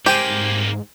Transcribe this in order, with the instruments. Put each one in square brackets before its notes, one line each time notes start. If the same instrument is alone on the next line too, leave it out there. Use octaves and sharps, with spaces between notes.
[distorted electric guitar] C2 A#3 [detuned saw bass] G#2 [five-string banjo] G4 [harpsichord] C5 G5 G#5